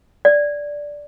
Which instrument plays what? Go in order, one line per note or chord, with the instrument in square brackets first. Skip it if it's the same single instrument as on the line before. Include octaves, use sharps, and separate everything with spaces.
[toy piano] D5